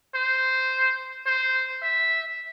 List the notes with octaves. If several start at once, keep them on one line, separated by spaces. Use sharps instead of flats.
C5
C5
E5